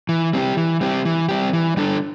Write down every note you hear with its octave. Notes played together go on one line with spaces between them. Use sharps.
E3
G3 C4 G4
E3
G3 C4 G4
E3
G3 C4 G4
E3
G3 D4 A4